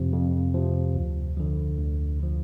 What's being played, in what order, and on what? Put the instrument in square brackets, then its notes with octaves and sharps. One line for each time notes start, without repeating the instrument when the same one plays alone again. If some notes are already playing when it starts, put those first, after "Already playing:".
Already playing: [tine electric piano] F2 C3 F3
F2
C3 F3
D2
D3 F3
D2
D3 F3